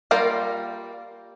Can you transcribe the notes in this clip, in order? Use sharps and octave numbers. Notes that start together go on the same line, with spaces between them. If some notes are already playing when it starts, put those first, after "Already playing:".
G3 A#3 F4 A#4